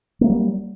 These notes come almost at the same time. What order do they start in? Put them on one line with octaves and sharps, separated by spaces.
A#3 A3 F#3 G3